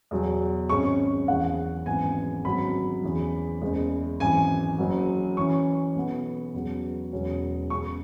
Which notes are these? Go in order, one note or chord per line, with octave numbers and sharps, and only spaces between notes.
E2 B2 F#3
G#1 F#2 C#3 G#3 C#4 C#6
F#1 E2 E3 F#5
G#1 F#2 E3 B3 G#5
G#1 F#2 F#3 B3 B5
E2 C#3 E3
F#1 E2 C#3 G#3
G#1 F#2 E3 G#5
F#1 F#2 F#3
F#2 E3 C#4 C#6
B1 B2 B3
E2 C#3 F#3 B3
E1 E2 C#3 F#3 C#4
E1 E2 C#3 C#6